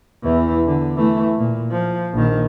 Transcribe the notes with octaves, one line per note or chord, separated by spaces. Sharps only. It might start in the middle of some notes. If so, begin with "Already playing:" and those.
E2 E3
D3
E3 A3
A#2
F3
A#1 D#3